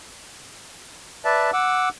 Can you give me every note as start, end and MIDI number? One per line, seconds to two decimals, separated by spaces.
1.25 1.51 71
1.25 1.51 74
1.25 1.51 76
1.25 1.51 81
1.53 1.89 78
1.53 1.89 86
1.53 1.89 88